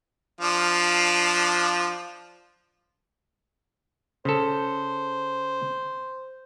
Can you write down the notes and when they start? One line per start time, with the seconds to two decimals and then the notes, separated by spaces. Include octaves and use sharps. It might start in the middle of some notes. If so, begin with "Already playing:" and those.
0.41 F3 D4 F5
4.25 C#3 A4 C5